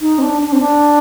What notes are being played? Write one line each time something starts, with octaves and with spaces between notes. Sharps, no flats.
D#4
C4
D4
D4
C4
D4